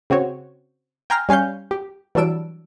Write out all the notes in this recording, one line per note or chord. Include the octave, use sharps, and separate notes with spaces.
C#3 C4 F#4 C#5
G5 G#5 A#5 C6 F6
G3 C#4 F5 C#6 G6
G4
E3 F#3 G3 D4 E6 D7